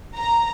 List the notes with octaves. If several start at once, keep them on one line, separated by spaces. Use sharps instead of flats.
A#5